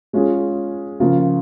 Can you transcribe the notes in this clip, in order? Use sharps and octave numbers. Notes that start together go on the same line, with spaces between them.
G#3 C#4 F4 G#4
C#3 F3 A#3 F4